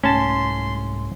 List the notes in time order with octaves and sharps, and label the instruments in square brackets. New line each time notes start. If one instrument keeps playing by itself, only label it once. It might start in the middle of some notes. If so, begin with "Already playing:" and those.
[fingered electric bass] C2 G#2 A3 [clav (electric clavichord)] C#4 A5 [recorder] C6